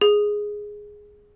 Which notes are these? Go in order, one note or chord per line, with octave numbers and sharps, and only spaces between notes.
G#4